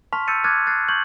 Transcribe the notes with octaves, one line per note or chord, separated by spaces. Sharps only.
A5 C6 C#6 F6 B6 F7
E6 G6 A6 C#7 D#7
D6 F6 F#6 G#6 A6 D#7
F#6 A6 C7
C#6 G6 G#6 F#7